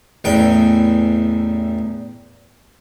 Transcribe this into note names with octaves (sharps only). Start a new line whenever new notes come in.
A1 E2 G5